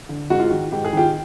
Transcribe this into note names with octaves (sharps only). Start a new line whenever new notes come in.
D3
G#2 F#4
F4
D#3 F#4
G#2 G4
G#4
D#3 F4 G4